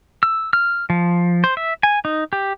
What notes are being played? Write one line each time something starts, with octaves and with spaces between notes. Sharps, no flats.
E6
F6
F3
C5
E5
G#5
D#4
G4